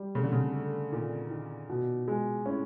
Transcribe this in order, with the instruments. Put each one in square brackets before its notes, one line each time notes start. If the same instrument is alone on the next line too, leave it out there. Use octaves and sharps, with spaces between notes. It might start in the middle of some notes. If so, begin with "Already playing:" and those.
Already playing: [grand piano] G3
[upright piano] C#3 [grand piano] A3
[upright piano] D3
C#3
[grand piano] A3
[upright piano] A#2 [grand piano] D#3
[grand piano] D#3
B2
G#3
[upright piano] A2 [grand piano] C#4